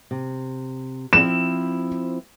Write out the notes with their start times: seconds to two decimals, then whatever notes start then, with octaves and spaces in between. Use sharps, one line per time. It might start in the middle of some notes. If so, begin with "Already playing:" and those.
0.11 C3
1.13 F3 C4 E4 E7